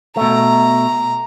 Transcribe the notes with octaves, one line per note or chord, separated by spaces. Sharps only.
B2 A3 A#5